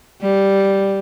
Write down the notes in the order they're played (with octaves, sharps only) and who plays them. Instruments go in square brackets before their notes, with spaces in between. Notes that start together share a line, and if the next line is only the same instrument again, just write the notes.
[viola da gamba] G3